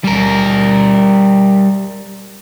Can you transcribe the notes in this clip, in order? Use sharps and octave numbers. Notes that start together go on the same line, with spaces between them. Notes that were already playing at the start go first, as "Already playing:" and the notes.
G3 A#4